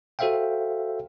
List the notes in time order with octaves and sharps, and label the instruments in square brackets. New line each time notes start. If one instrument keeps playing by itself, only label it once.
[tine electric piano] F#4 A4 C5 E5 F5 G5